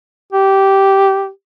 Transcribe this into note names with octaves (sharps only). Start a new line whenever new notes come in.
G4